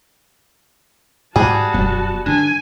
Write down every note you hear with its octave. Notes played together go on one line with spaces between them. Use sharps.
G#2 G3 F#4 G#4 A5
E1 F#2 B3
G2 D3 D4 G#5